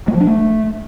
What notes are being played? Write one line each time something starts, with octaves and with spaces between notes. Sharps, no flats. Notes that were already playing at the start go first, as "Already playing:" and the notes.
G#3
F3
D4
A3